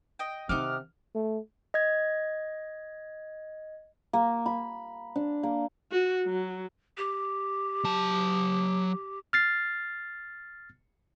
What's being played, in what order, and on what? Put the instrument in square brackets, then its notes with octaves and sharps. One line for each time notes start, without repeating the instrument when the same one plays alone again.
[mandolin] D#5 G5
[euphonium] C3 [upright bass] D#3 C4 [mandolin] D#4 F#5 D6 [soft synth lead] F6
[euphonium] A3
[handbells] D#5 G#6
[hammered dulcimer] A#3
B5
D4
A#3
[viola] F#4
F#3
[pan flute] G4
[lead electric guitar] F#3 A5
[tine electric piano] F6 A6 C7